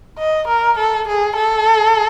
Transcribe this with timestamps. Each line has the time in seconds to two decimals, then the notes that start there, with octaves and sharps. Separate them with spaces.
0.18 D#5
0.48 A#4
0.78 A4
1.08 G#4
1.36 A4